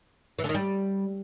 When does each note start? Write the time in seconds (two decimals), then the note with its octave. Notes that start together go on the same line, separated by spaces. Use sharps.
0.39 E3
0.44 D3
0.49 D#3
0.54 G3